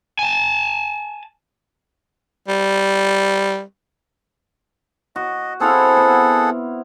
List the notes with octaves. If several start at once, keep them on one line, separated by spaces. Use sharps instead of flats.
G#5 A5
G3
F#4 D#5
C4 E4 G#4 A4 F5 F#5
B3